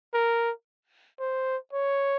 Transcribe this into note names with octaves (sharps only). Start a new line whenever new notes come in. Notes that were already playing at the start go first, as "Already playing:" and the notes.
A#4
C5
C#5